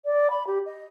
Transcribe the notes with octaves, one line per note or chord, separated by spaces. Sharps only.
D5
B5
G4
D#5